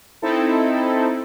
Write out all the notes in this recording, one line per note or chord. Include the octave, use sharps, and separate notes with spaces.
C4 D#4 E4 A4